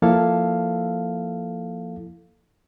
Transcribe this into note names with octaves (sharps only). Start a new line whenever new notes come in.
F3 A#3 E4 A4 F5